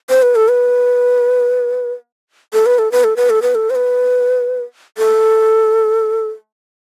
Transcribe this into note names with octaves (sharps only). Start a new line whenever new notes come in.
C5
B4
A4
B4
A4
B4
A4
B4
A4
B4
A4
B4
A4
C5
B4
A4